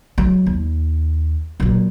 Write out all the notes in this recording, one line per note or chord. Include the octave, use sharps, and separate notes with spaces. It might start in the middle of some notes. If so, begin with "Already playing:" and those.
F#3 G#3
D#2
A#2 F#3